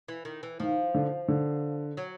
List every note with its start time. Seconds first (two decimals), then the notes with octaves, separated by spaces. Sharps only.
0.08 E3
0.25 D#3
0.43 E3
0.60 D#3 F3
0.95 D3
1.28 D3
1.97 F#3